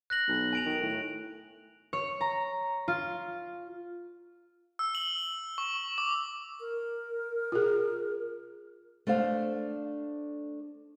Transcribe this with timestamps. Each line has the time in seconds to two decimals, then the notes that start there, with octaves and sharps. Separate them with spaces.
0.10 F#6 A#6 F#7
0.28 B1
0.53 G#5 D7 F7
0.65 D#3
0.81 A2
1.93 C#5
2.21 A#5
2.88 F4
4.79 E6
4.95 F#7
5.58 C#6
5.98 D6
6.60 A#4
7.52 F4 G#4
9.07 A3 D4 C5 F5